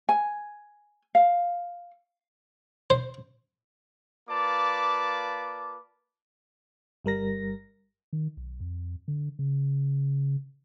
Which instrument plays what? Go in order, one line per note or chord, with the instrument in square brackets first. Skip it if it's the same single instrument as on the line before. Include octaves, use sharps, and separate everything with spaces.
[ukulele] G#5
F5
[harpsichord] C5
[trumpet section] A#3 F4 B4 D5 A5 D6
[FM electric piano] G1 G3 A#4 A#6
[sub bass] D#3
B1
F2
D3
C#3